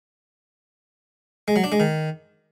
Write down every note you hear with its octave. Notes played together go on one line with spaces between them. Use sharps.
G#3
F#3
D4
G#3
D#3